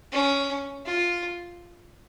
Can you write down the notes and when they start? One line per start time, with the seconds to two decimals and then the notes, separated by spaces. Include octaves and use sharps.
0.12 C#4
0.85 F4